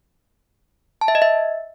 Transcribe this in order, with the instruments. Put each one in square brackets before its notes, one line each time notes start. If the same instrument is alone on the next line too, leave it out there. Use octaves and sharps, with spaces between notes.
[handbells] A5
E5
D#5
E5